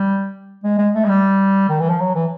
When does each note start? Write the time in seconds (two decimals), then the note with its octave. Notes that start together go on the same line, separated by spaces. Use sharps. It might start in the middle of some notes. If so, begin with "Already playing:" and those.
Already playing: G3
0.64 G#3
0.78 G#3
0.95 A3
1.05 G#3
1.09 G3
1.69 D#3
1.80 E3
1.90 F3
2.01 F#3
2.15 E3